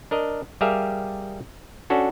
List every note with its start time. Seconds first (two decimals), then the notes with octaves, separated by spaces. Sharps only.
0.11 D4 A#4 D#5
0.61 G3 G4 G#4 A#4 E5 F5
1.90 C#4 D4 F#4 A4